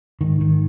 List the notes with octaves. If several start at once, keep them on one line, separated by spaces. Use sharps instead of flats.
G#2 D#3
D#3